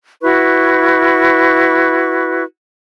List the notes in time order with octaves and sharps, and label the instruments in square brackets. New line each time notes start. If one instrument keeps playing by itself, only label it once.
[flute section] E4 F#4 B4 C#6